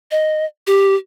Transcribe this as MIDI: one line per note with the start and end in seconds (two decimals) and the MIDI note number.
0.11 0.45 75
0.67 0.95 67